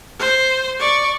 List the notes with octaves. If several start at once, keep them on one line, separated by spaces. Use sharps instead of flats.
C5
D5 C#6